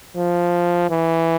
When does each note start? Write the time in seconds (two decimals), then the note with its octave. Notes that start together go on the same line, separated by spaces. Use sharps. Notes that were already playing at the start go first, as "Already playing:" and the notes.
0.17 F3
0.90 E3